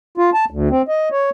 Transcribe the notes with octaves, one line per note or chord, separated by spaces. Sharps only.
F4
A5
D2
C4
D#5
C#5